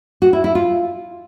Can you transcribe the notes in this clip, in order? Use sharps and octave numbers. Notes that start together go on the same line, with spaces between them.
F#4
E4
E4
F4